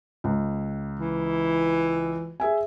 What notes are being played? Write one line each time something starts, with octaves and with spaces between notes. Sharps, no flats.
C#2
E3
G#4 E5 G#5